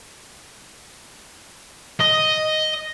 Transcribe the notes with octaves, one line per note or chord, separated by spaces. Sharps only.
D#5